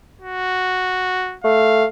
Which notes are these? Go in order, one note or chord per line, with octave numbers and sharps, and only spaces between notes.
F#4
A3 F5